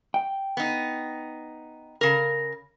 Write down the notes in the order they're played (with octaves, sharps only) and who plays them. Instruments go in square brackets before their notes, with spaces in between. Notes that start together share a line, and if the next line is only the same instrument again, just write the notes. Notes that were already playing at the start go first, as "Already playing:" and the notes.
[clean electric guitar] G5
[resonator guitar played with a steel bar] B3 D#4
C#3 A#4